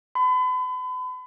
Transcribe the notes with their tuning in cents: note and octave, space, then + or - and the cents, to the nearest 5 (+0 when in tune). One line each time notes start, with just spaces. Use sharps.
B5 +40